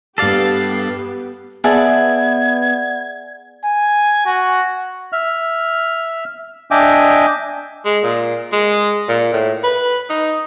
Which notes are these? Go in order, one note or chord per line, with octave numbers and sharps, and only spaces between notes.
G2 B3 G4 A4 D5 F5 C7
B3 G#4 D5 E5 F#5 A5 G#6
G#5
F#4
E5 F6
D4 D#5 E5 G5 G#5 D6
G#3
A#2
G#3
A#2
A2
B4
D#4